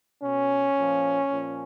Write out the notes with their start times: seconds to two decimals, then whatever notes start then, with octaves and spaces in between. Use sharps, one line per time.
0.22 B2 C#4
0.77 A#2 F3
1.30 A#2 F3